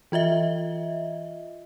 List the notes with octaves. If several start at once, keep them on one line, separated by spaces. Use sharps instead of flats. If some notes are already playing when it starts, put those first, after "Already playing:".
E3 F4 D#5 E5